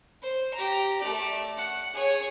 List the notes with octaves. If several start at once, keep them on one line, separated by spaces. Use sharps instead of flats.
C5
G4 A#5
A3 D5
F#5
G#4 C#5